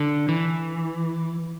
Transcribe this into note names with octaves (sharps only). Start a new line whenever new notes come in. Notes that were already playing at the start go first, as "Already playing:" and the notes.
Already playing: D3
E3